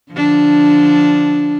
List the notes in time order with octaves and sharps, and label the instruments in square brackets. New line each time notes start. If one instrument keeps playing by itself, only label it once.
[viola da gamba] D3 F3 D4